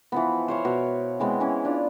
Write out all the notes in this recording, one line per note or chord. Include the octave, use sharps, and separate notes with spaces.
E3 F3 B3
C5 C#5 F5
B2
E3 G#3 B3 C4
E3 C#4 E4
D4 F4 F5